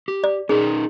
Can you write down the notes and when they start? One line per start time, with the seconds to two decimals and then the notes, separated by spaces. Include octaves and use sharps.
0.08 G4
0.24 D5
0.49 C#4 D#4 G#4 A#4